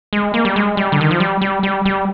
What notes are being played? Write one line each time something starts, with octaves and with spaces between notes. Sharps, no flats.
G#3
A#3
G3
G#3
G3
D3
D#3
F3
G3
G3
G3
G3